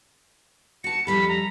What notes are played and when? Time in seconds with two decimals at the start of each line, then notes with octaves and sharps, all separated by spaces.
0.84 F#4 A5 C#7
1.07 F2 G3 A4 B5
1.28 A#5